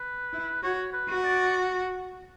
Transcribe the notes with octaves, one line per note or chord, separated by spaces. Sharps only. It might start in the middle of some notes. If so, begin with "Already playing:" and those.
Already playing: B4
E4
F#4 C#5
B4
F#4
D5